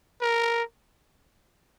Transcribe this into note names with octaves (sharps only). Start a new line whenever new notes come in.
A#4